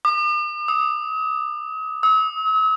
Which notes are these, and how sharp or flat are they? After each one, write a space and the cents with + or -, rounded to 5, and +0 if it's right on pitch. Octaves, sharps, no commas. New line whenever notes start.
D6 +45
D#6 +40
E6 -45